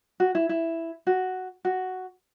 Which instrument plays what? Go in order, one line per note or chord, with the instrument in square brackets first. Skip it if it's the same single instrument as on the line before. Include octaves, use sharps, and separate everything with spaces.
[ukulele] F#4
E4
E4
F#4
F#4